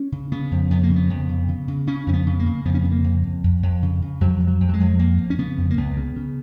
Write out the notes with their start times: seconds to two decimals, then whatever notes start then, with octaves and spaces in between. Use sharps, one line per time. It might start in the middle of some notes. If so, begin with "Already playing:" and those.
Already playing: C#4
0.12 C#3
0.32 C#3 B3
0.51 F2
0.71 F2 B3
0.83 A#3
0.90 C#3
0.96 B3
1.10 F2
1.29 C#3
1.48 C#3
1.68 C#3
1.87 C#3 C#4
2.07 F2 C#4
2.13 B3
2.26 C#3
2.39 A#3
2.46 C#3
2.65 F2 B3
2.74 C#4
2.83 C#3 B3
2.91 A#3
3.04 F2
3.24 F2
3.44 F2
3.63 F2
3.82 C#3
4.02 C#3
4.21 F2 F#3
4.40 F2
4.47 F#3
4.60 F2
4.69 F#3
4.74 G#3
4.80 F2
4.99 F2 A#3
5.19 F2
5.30 C#4
5.39 C#3 B3
5.58 F2
5.71 A#3
5.77 C#2 B3
5.97 C#3
6.16 C#3